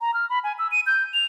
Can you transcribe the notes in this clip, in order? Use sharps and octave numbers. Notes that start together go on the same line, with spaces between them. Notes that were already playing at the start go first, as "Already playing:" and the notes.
A#5
F6
B5
G#5
E6
D#7
G6
F7